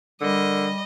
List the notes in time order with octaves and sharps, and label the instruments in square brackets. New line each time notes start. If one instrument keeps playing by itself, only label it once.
[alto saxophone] D3 [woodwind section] G3 [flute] A#4 [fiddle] D#5